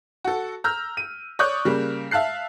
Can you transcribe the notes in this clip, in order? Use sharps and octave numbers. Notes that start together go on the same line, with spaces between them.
F#4 A4
A#5 E6 F6 G6
D#7
C#5 D5 C#6 D#6 F#6 G6
C#3 G3 A#3
E5 F5 A5 F#6 C7